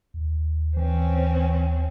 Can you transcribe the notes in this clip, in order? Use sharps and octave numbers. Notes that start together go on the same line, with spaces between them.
D#2
E3 C4 C#4